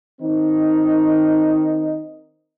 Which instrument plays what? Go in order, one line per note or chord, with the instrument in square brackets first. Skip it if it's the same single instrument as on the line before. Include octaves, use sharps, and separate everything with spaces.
[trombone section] D#3 C4 D#4